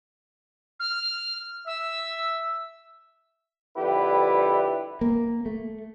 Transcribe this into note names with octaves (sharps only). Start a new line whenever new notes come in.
F6
E5 E6
F2 D3 G3 E4 G4 B4
A#3
A3